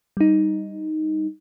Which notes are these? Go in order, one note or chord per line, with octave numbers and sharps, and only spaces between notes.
G3 D#4